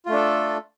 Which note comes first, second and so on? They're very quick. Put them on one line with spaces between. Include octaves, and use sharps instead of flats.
F4 A3 D4 A4